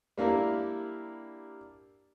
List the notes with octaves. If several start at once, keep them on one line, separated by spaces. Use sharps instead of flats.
G3 A#3 D4 E4 A#4